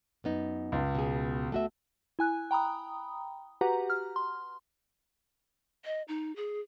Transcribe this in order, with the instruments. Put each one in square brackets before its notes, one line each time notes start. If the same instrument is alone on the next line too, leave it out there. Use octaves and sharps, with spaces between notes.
[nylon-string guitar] F#2 B3 D#4
[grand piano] C#2
[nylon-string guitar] B2 G#4
A3 F#4 E5
[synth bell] E4 G#5 F#6
G5 A#5 B5 D#6
F#4 G4 B4 F#5 A#5
F6
C6
[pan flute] D#5
D#4
G#4